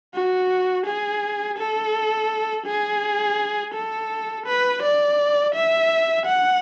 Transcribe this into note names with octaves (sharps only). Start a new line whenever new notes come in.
F#4
G#4
A4
G#4
A4
B4
D5
E5
F#5